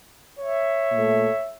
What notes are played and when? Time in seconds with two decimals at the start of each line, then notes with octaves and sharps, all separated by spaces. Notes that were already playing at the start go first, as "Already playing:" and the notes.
0.40 C#5 E5
0.92 A#2 A3